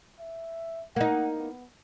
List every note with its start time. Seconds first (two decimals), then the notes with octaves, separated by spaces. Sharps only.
0.20 E5
0.96 A#3 D#4 F#5
1.38 B3